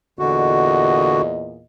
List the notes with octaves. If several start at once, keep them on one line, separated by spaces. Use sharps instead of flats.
E2 A#2 D3 F#4 D#5